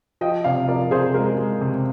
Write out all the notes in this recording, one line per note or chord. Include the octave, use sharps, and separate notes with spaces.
F3 D#5 G5
C3 D5 F5
F3 A#4 D5
C3 G#4 C5
G#3 A#4
G#3
C3